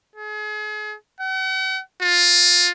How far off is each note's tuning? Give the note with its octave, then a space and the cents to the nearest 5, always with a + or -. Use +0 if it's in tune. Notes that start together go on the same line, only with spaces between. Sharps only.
G#4 +35
F#5 +45
F4 +15